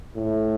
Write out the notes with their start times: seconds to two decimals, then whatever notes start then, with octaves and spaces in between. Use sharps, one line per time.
0.15 A2